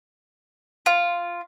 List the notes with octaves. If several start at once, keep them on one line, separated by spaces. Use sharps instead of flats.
F4